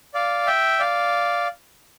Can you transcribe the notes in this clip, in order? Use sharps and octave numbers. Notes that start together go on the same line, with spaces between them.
D5 F5
E5 G5
D5 F5